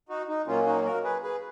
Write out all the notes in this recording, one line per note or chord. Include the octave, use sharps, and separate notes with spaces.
D#4 F#4
D#4
A#2 F#3 A#3 C#4 F4
D#4 F#4
F#4 A#4
G#4 B4
G#4 B4